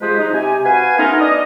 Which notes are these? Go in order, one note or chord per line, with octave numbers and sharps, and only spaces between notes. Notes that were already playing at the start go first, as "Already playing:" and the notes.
C3 F3 G#3 G#4 B4 C5
D#4
C3 G#5
F#4 B4 F5 G#5
A3 B3 C#4 D#4 F4 A#4
D4 D#5